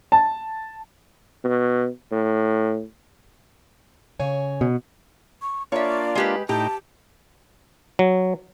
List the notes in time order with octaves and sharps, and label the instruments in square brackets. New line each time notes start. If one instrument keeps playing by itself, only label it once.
[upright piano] A5
[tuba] B2
A2
[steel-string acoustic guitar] C#3 C#5 G#5
[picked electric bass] B2
[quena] C#6
[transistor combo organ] A#3 D4 F4 [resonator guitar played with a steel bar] C#5 E5 [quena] D5
[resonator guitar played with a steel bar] G#3 G4 B4
[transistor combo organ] A2 D#4 G5 [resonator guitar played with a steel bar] G4 [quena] A5
[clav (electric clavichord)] F#3